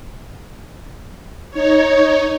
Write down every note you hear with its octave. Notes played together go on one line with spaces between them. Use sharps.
D#4 C#5